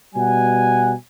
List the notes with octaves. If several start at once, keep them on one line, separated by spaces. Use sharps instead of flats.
B2 G3 F#5 G#5